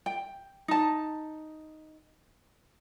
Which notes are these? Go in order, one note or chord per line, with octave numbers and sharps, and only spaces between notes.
G5
D#4 A5